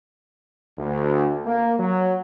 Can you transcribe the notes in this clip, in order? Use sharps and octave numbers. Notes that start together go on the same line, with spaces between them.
D2
A#3
F#3